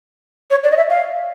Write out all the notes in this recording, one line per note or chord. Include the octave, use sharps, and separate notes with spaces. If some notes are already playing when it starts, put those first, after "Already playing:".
C#5
D5
D#5
E5
F5